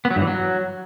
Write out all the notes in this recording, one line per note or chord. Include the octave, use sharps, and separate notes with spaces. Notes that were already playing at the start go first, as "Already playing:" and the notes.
B3
F#3
G2
E3
F#3